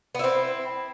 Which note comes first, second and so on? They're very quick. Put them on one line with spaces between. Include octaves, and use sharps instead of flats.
B3 E4 C4